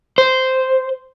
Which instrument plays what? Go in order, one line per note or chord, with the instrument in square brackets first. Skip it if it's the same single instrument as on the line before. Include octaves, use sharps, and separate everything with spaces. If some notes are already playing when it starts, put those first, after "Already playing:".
[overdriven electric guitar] C5